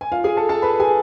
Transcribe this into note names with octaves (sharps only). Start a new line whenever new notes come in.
G#5
F4 F5
G#4 G#5
A4 A5
A4 A5
B4 B5
G#4 G#5